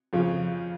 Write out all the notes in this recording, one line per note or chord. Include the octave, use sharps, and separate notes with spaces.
F2 C#3 F3